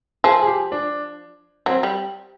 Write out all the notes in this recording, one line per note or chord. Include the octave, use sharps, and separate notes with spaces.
F3 G#4
G#4
G4
D4
F#3 C4
G3